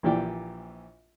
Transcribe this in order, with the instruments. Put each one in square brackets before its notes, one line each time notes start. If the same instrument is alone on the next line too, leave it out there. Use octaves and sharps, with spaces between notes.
[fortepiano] A#1 A#2 E3 G4 D5 G5